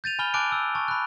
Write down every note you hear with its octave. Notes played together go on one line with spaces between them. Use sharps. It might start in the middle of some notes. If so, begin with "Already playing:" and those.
G6 A6 D#7 F7
G#5 B5 F6 G7
G#5 A5 D6 F#6 D7
E6
A5 C#6
B5 F#6